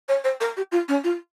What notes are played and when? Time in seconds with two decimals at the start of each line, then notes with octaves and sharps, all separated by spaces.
0.09 C#5
0.24 C5
0.41 A#4
0.57 G4
0.72 F4
0.88 C#4
1.04 F4